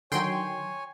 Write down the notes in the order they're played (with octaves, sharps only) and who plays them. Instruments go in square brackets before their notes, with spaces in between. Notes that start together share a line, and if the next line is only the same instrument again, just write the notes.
[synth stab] D3 D#3 F#3 [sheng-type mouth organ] C#5 G#5 [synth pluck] G5 C6